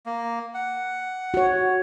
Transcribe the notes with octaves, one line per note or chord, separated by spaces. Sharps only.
A#3
F#5
F#4 C#5